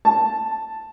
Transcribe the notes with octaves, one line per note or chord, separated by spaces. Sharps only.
A5